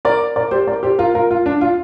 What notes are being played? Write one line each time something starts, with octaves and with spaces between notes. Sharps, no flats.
A#4 D5
A#4 D5
G4 C5
A#4 D5
G4 C5
F4 A#4
F4 A#4
F4
D4
F4